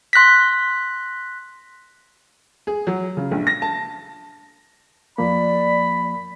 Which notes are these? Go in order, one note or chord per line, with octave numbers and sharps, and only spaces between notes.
C6 F#6 A#6 B6
G#4
F#3
C#3
A#1
A#6
A5
F2 F3 A#3 D5 B5